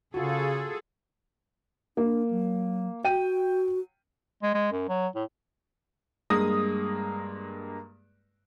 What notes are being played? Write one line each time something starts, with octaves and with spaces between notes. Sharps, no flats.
C#3 F4 F#4 G#4 A4
A#3 D4
F#3
F#4 G5 D#7
G#3
G#3
F#2
F#3
A2
G2 G#3 A#3 D#6 A#6